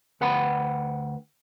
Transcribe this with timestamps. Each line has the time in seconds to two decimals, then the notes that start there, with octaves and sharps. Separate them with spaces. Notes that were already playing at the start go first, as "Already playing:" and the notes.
0.21 D2 B4 F#5 G5 B5